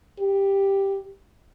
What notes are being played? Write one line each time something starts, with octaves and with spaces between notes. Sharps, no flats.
G4